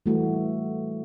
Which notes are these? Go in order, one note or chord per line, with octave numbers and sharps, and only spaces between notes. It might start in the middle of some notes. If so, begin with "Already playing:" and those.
E3 G3 A3 F#4